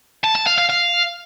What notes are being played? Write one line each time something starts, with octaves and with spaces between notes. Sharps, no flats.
A5
A5
F5
F5
F5